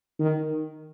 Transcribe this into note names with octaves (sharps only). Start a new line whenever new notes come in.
D#3